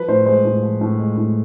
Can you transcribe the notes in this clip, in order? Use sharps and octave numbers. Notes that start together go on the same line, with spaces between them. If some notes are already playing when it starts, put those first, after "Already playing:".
Already playing: F3 B4
A2 C5
G#3 C5
A2
F3
A2
G#3
A2